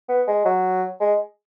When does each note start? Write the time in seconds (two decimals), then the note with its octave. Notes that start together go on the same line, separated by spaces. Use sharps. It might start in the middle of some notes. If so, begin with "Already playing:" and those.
0.09 B3
0.27 G#3
0.45 F#3
1.01 G#3